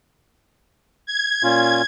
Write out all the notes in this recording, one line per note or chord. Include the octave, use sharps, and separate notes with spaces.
G#6
A#2 C#4 F4